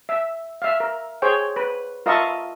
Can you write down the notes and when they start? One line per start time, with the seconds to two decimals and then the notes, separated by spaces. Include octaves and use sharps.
0.09 E5
0.62 E5 F5
0.80 A#4
1.22 G#4 C5 C#5 G5
1.56 B4
2.06 F4 A#4 D#5 E5 A5 C#6